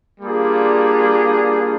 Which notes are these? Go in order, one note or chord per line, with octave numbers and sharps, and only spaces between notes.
G3 A#3 D4 F4 G#4